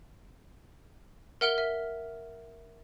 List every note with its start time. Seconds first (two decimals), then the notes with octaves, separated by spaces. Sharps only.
1.41 A#4 E5 F#5 F6 D7 G7
1.58 E5